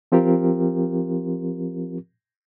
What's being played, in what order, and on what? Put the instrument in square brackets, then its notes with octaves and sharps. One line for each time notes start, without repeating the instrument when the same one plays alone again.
[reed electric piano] F3 C4 F4 G4 A#4